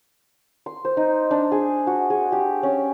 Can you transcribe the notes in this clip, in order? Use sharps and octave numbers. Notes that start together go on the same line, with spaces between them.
C6
C5
D#4
D4
G#4
F#4
G#4
G4
C#4